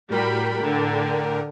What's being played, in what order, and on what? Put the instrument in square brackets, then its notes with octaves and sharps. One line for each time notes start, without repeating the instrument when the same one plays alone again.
[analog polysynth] A2 A#4 G5 [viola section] G3 F#4 B5
[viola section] D3